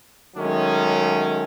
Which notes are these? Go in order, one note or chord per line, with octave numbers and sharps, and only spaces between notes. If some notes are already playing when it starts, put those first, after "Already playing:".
D#3 F#3 G#3 A3 C#4